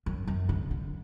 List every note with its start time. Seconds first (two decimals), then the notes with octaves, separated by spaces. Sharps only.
0.06 F#2
0.27 F#2
0.49 D3
0.71 D3